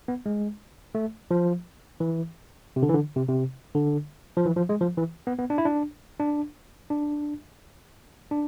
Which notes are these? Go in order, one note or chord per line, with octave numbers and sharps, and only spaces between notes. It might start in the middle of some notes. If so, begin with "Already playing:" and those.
B3
G#3
A3
F3
E3
C3
D3
E3
D3
C3
C3
D3
F3
E3
F3
G#3
F3
E3
B3
B3
D4
E4
D4
D4
D4
D4